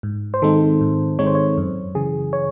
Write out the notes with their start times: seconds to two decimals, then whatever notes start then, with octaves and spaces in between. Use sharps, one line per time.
0.03 G#2
0.34 C5
0.42 D#3 G#3 C4 D#4 A4
0.81 G#2
1.19 D#3 G#3 C4 D#4 C#5
1.27 C5
1.35 C#5
1.57 F#2
1.95 C#3 E3 G#4
2.33 C#5